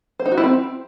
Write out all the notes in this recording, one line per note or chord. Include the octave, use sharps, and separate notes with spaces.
C5
D#4
F#4
E4
C4